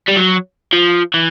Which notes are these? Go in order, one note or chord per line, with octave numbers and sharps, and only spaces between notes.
G3
F#3
F3
E3